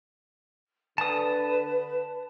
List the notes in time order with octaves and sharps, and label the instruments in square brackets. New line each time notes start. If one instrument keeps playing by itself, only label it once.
[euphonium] D3 [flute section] B4 [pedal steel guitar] A5 D#6